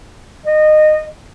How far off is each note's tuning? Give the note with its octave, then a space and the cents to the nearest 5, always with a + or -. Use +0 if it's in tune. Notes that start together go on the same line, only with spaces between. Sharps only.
D#5 -20